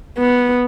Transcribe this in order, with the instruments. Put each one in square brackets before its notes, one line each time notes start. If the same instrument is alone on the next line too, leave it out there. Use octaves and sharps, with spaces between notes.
[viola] B3